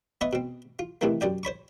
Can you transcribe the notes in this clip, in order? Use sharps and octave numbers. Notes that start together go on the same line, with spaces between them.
B3 B4 D#5 E5 C#6
B2 C4
F4
C3 D#3 E3 A3 A#3
F#2 G4 D5 G5
C5 C#5 B5 C#6